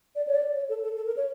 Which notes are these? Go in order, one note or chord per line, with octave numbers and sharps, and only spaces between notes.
D5
C#5
D5
C#5
A4
A4
A4
A#4
C#5